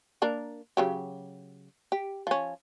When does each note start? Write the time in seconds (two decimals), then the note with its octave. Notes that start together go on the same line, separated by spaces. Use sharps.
0.22 A#3 D4 A#4
0.77 C#3 F#3 G4
1.92 G4
2.27 F3 C#4